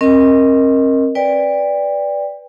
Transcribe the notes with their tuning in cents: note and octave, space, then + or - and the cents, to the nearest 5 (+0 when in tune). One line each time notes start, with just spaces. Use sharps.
C4 +45 A#4 +0 D#5 +0
B4 +0 D5 -5 G5 +30